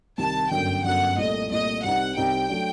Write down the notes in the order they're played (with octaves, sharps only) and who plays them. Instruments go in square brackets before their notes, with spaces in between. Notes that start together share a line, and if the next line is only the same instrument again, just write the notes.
[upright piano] C2 C3 D#3 [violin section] A5
[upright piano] G1 F#2 D3 [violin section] G5
[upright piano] G1 F#2 D3 [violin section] F#5
[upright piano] C2 A#2 A3 [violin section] D#5
[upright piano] C2 A#2 A3 [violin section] D#5
[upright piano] C2 C3 G3 C4 D#4 [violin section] F#5
[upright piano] C2 C3 G3 C4 D#4 [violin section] G5
[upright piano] F#3 A3 D4